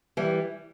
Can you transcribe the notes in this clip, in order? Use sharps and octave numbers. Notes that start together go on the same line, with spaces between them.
E3 G3